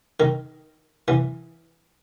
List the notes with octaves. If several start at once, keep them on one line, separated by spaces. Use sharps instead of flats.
D#3
E3